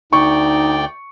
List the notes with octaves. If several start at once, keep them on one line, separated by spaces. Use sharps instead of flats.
D2 D#4 D5 G5 C#6